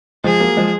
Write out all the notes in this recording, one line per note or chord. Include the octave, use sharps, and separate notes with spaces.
F3 G#3 G#4
F#3 A#3
F3 G#3